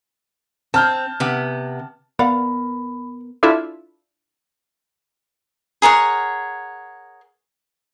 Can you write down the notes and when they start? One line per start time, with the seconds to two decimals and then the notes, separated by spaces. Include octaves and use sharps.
0.74 C4 A5 F6 G6
1.20 C3 B3
2.19 B3 A#4 D5 F5 F#5 B5
3.43 D4 E4 F4 A4 E5
5.82 G#4 A#4 C#5 F#5